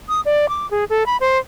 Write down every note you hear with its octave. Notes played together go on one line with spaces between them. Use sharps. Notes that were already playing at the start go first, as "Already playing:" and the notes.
D#6
D5
D6
G#4
A4
B5
C5